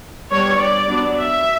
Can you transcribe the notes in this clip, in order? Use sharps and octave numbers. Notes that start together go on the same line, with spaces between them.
G3 B3 D4 C#5
D5
F#3 B3 D4
E5